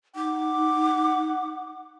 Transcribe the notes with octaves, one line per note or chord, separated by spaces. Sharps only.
D#4 F#5 D6